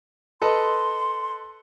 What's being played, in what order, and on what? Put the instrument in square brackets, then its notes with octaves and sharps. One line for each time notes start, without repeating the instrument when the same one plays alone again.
[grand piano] A4 B4 D#5 [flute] C6